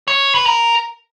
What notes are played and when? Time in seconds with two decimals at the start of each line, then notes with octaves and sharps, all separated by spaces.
0.08 C#5
0.35 B4
0.46 A#4